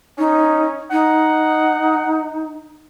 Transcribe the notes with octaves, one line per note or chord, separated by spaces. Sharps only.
C#4 D#4
D#4 F#5